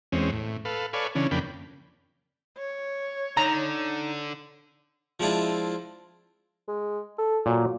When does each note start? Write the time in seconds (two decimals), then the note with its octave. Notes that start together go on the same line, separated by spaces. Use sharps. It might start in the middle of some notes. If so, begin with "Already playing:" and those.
0.12 E2 G#3 C4 C#4
0.32 A2
0.65 A4 B4 F5
0.93 A4 B4 C#5 D5 F5 G#5
1.15 C#3 E3 C#4 D4
1.31 F2 C#3 A#3 D4 G5 B5
2.58 C#5
3.37 D3 D#4 A#5
5.20 F3 G#3 C4 D4 E4 F4
6.68 G#3
7.18 A4
7.46 A#2 F#3